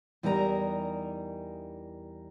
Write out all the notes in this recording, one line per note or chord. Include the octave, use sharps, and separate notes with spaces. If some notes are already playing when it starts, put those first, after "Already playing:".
E2 E3 G3 D#4 A#4 A#5